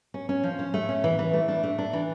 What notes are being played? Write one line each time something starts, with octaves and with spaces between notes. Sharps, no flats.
C#4
C#4
F3
C#4
A3
C#4
E3
E3
A3
D4
A3
D4
E3